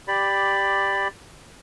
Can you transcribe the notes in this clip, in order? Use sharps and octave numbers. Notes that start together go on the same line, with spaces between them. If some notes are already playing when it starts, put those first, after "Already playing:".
G4 D5 B5